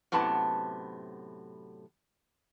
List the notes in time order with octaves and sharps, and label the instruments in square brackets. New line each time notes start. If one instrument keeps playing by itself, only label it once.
[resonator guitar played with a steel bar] F#2 A2 C3 B3 A5